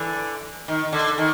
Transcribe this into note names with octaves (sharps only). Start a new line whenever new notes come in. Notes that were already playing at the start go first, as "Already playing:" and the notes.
Already playing: D3 E3
D#3
D3
D#3